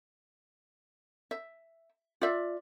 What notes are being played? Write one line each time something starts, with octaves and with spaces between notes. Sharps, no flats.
E5
F4 D5 E5